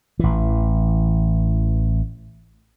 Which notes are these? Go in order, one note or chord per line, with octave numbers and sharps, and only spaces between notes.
A1 E3